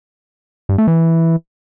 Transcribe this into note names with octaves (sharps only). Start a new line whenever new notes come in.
G2
A3
E3